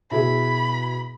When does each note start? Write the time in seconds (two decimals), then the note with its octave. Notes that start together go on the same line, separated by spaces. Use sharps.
0.11 B2 E4 G#4 B5